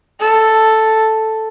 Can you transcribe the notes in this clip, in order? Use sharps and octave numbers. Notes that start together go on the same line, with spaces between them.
A4